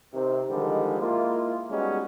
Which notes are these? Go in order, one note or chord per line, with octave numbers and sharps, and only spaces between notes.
C3 D#3 C4
D3 D#3 F3 G3 G#3
G#3 A#3 E4 F4
G3 G#3 B3 C#4 D#4 F#4